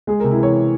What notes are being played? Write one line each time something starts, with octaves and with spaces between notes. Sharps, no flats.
G#3 G#4
A#4
C3
E4
E3 C#5